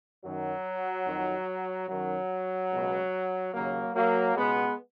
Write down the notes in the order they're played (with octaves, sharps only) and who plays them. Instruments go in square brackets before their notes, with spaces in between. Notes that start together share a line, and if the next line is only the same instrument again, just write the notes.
[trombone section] F#2 D#3 F#3
F2 D#3
F#2 D#3 F#3
C#2 B2
D#2 C#3 F#3 A#3
F#3 A#3
C#2 B2 G#3 B3